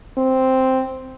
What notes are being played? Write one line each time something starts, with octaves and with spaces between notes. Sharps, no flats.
C4